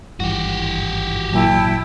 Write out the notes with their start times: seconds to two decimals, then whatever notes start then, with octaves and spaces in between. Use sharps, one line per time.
0.20 G#1 G2 E3 F#4 G4
1.32 A#2 F#3 E4 G5 A5